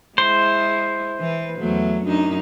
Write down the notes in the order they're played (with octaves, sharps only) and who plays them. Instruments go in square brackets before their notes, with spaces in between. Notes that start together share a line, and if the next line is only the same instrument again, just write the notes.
[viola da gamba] G#3 E4 [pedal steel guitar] C5
[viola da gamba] E3 B4
E2 F#3 A3
F#2 D4 D#4